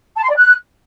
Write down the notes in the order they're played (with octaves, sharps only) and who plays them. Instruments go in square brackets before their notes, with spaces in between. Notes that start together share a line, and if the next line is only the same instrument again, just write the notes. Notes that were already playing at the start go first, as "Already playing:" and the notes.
[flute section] A5
C6
D5
F#6